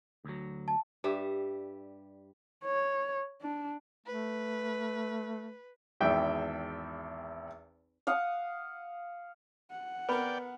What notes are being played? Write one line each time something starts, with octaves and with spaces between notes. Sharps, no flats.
D2 F#3
A5
G2 G3 E5
C#5
D4
A3 B4
G#1 E2 E5 G5
F5 F#5 D#6
F#5
B3 A#4 B4 D5 G5 B5